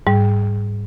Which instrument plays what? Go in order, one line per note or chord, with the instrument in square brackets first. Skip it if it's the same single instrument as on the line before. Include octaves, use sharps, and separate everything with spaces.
[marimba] G#2 G3